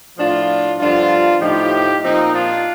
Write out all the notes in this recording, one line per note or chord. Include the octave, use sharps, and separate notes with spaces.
A2 F3 D4 F4
G2 D3 F3 D4 F4
A2 F3 D#4 G4
A#2 F3 C4 D#4
D4 F4